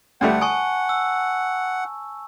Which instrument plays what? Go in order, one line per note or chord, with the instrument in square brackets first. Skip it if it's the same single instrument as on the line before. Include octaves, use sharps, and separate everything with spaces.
[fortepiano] D2 G3 A3 [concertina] F#5
[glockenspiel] G#5 A5 C#6 [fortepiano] D#6
[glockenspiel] E6